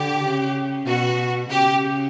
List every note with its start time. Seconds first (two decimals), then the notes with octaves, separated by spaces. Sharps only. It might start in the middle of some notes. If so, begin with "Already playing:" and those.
Already playing: D3 G4
0.24 C#3
0.87 B2 F#4
1.49 C#3 G4